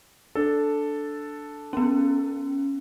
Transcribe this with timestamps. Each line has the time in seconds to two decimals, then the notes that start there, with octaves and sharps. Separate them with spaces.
0.35 D4 A4
1.73 B3 C#4